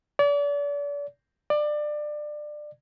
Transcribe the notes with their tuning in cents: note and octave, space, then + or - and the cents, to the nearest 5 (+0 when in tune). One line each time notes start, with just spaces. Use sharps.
D5 -35
D5 +25